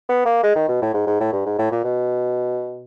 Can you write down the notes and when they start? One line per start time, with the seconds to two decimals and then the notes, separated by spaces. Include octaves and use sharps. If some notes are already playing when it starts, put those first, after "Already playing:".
0.09 B3
0.26 A#3
0.43 G#3
0.56 D#3
0.68 B2
0.82 A2
0.94 G#2
1.07 G#2
1.20 A2
1.33 G2
1.46 G#2
1.58 A2
1.71 A#2
1.84 B2